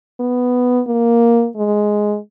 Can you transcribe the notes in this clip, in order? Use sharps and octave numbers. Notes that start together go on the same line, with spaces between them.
B3
A#3
G#3